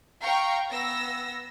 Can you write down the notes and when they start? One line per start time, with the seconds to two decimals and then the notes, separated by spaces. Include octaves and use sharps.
0.22 F5 G5 A#5 C#6
0.73 B3 E6 A#6